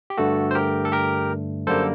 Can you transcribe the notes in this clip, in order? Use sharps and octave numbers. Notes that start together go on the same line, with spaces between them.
G4
G2 D3 A3 F#4 A4
C5
G4 A#4
A4
G4 A#4
F#2 D3 G3 A#3 A4 C5